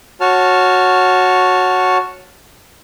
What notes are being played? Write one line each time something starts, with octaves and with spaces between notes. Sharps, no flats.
F#4 C#5 A5 F6